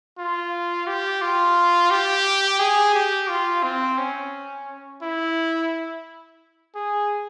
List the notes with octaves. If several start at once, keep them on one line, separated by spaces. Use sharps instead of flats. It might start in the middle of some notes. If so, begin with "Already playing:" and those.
F4
G4
F4
G4
G#4
G4
F4
C4
C#4
E4
G#4